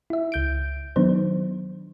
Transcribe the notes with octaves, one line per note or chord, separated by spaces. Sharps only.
E4 E5
C#2 G6 D7
D#3 F#3 B3 D4 D#4 C5